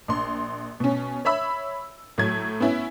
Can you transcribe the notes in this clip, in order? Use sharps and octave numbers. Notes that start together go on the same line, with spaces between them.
A#1 C6
B2 C#4
C#5 E5 B5 E6
A2 F#3 A3 G#6
B3 C#4 E4